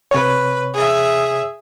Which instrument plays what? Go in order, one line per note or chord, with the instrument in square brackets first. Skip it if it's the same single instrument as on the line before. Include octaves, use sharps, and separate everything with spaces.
[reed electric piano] C3 C#5 [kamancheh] B4
[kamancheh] G#4 E5